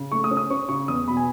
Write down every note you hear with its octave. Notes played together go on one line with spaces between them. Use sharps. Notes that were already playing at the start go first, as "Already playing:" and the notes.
Already playing: C#3
A3 C#6
D#6
C#4
D#6
C#4 C#6
C#3 C#6
E2 D#6
B2 B5
G#5